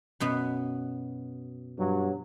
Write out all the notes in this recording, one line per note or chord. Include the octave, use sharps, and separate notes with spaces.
F#2 B2 B3
G2 F#3